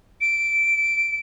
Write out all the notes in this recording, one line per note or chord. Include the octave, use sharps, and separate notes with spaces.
D7